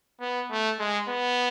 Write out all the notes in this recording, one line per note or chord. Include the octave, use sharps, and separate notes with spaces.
B3
A3
G#3
B3